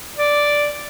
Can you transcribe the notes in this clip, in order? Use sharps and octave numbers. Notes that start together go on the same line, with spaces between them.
D5